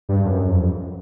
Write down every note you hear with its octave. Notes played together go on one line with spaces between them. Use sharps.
G2
F#2
F2